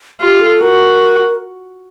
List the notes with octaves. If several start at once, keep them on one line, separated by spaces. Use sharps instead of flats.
F4 G4
A4
F#4 A#4